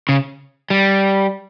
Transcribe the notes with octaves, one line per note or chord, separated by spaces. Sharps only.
C#3
G3